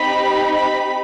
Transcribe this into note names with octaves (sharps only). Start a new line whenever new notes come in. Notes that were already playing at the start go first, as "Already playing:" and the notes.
Already playing: C4 D#4 G4 B5
B5